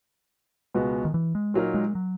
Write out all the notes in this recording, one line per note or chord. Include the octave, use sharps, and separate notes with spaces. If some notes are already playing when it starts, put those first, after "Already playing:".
C#2 B2 G#3 B3 F#4
D#3
E3
G#3
A#2 F#3 A#3 D#4 A#4
G#3
F#3